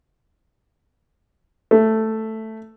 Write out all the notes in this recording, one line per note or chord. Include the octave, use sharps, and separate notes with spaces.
A3